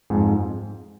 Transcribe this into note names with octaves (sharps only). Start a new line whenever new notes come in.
F2 G#2